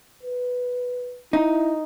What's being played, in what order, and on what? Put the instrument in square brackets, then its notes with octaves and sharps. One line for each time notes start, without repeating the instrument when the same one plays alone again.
[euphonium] B4
[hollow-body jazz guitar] D#4 [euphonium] E4